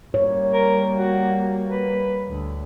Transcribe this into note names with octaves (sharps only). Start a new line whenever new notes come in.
G3 A#3 C#5
A#4
F#4
B4
D2